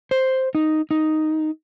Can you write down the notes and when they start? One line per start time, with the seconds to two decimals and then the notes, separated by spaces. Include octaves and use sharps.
0.11 C5
0.55 D#4
0.91 D#4